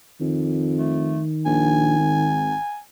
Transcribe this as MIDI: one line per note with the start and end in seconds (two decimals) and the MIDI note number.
0.21 1.20 41
0.21 2.60 51
0.78 1.21 57
1.46 1.98 34
1.46 2.78 80
1.99 2.55 32